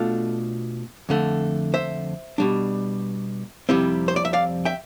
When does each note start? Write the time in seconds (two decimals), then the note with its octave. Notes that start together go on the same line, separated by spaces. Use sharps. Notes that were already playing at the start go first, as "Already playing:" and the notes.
Already playing: B2 A3 D4 F4 A4
1.09 F2 D3 A3
1.74 C5 E5
2.38 B2 G3 D4
3.69 F2 C3 G3 C4 E4
4.08 C5
4.16 D5
4.25 E5
4.33 D5 F5
4.65 E5 G5